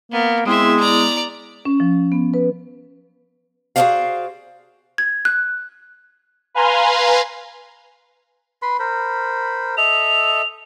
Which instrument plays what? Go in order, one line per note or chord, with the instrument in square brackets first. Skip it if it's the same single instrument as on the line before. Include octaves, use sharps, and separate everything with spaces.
[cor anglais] A#3 [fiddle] B3
[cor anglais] G#3 [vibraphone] B3 E4 G#4 [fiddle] C4 E5
[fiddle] D5 A#5
[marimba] C#4
F3
B3
B4
[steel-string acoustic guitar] F#4 G#4 A#4 C5 D5 F5
[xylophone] G#6
F#6
[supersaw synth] B4 F5 G#5 A#5 C6
[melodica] B4 B5 C6
A#4 C5 B5
[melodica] A4 D#5 E5 [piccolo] F7